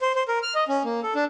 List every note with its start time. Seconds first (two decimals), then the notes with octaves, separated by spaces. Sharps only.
0.01 C5
0.15 C5
0.28 A#4
0.43 F6
0.55 D#5
0.68 C#4
0.84 A#3
1.03 A4
1.15 D4